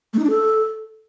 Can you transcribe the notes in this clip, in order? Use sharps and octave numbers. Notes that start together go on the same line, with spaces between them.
A3
D#4
D4
A4